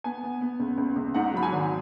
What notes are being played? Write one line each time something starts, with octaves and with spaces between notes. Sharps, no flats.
B3 G#5
B3
B3
C#2
C#2
C#2
G#2 F#5
F#3 B5
G#5
G#1